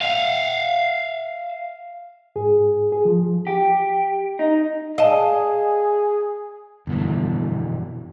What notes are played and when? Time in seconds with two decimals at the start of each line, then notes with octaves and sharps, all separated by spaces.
0.01 E5 F5
2.36 G#2 G#4
2.92 G#4
3.05 F3
3.47 G4
4.39 D#4
4.98 G#4 D#5 F5 A5
6.87 G1 F2 B2 E3